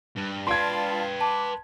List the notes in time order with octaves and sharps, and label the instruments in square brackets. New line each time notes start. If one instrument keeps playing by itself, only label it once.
[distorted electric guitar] G2
[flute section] F4 D5 A5 [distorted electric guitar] B4 G5 [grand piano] C6 G#6
[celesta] A5 [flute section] D6